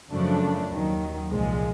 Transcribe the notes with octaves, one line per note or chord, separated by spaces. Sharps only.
F#2 C#3 F3 A3 D4
D#2 D#3 F#3
C2 A#2 F3 G#3